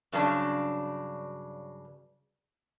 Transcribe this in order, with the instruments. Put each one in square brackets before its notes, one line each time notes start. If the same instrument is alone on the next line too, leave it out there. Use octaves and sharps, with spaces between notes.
[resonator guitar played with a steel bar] G2 C#3 F#3 D4